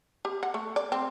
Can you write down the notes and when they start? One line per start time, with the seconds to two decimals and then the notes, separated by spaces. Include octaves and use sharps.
0.25 G4
0.43 F#5
0.54 A3
0.76 D5
0.92 C4